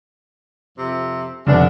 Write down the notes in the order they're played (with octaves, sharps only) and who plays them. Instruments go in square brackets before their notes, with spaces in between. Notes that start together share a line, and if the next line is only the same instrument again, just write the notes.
[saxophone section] F2 C3
[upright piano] F1 D3 B3 [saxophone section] C#4 D4